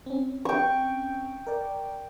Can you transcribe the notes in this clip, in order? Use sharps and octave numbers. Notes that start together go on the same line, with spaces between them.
C4 C#4
G5 C#6
A#4 D5